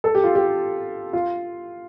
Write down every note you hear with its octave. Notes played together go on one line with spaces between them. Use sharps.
A4
G4
F4
G4
F4